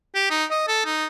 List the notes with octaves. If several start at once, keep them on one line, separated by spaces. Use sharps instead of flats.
G4
D#4
D#5
A4
D#4